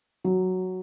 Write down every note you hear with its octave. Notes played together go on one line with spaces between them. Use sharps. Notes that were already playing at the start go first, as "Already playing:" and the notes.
F#3